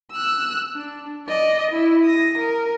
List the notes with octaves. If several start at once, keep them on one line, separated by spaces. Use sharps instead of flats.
E6 F#6
D4
D5 D#5
E4
D#6 A#6
A#4